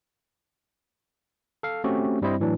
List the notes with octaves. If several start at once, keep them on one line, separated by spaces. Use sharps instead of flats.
A4 F5
A3 C4 C#4 F#4 G4
G2 G3 C4 E4 C5 D#5
A2 E3 F#3 D4